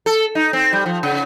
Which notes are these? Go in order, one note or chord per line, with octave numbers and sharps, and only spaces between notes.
A4
D#4
C4
G3
F3
C#3